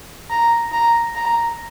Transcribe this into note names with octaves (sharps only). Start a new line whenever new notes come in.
A#5
A#5
A#5